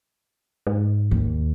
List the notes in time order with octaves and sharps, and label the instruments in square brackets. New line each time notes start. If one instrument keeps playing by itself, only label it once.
[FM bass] G#2
[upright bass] D#2